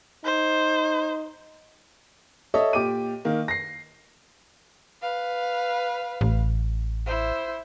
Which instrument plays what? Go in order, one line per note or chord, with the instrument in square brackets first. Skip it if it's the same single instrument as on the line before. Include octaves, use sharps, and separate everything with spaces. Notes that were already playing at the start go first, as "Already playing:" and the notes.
[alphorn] D#4 [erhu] C5
[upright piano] A4 C#5 D#5 E5
A#2 G4 D6 D#7
D#3 A#3
A#6 C7
[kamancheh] B4 F5
[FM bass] A1
[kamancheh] E4 C5